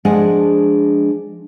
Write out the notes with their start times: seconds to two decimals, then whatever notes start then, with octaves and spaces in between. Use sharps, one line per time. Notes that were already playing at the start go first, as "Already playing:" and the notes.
0.05 F3 G#3 D4 G#4 F#5 G#5